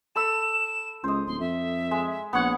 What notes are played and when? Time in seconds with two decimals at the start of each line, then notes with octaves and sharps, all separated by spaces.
0.16 A4 B5 E6 E7
1.04 C#2 C5 D#5
1.27 D1 C6
1.40 F2 E5
1.91 G#3
2.33 A#1 B3 C#5 F#5